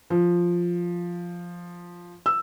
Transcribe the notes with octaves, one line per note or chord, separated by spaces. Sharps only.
F3
E6